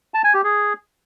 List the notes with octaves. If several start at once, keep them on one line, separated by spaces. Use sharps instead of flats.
A5
G#5
G4
G#4